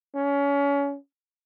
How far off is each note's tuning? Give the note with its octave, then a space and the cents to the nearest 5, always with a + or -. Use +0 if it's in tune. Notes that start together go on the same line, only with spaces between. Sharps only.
C#4 +30